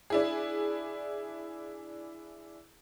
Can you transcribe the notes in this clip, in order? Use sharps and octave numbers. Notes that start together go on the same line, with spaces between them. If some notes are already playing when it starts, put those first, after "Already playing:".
D4 E4 G#4